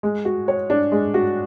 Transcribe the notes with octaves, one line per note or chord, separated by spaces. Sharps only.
G#3
F#4
C#5
D4
G#3
F#4